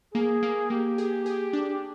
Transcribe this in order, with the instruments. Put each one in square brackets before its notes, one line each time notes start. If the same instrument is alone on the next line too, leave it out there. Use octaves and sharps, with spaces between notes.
[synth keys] A#3 [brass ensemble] G#4
[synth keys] A#3
[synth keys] A#3 [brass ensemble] G4
[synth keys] G#4
G#4
D4